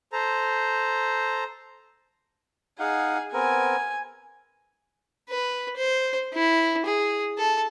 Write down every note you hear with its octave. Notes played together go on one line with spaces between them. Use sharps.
A4 C5 A#5
D#4 G#4 F5 F#5
B3 C4 A#4 G#5
B4
C5
E4
G#4
A4